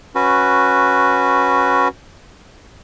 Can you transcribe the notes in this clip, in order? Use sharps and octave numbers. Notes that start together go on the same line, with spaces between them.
C#4 F#4 B4